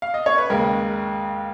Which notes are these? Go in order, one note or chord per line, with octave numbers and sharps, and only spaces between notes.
F5
D#5
C#5
B4
D#2 C#3 G#3 A#4